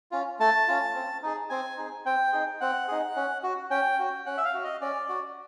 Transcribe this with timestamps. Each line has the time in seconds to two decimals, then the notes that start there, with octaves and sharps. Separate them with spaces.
0.11 C#4 F4
0.40 A3 A5
0.68 C#4 F4
0.95 C4
1.23 D#4 G#4
1.50 C4 G#5
1.77 D#4 G#4
2.05 C4 G5
2.33 D#4 G#4
2.61 C4 F#5
2.88 D#4 G#4
3.16 C#4
3.43 F#4
3.70 C#4 G5
3.99 F#4
4.26 C#4 F#5
4.38 E5
4.45 F5
4.54 F#4
4.64 D#5
4.81 C#4 D5
5.09 F#4